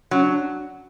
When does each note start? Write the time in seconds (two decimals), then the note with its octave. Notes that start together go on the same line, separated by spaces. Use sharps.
0.11 F#3 C#4
0.23 D4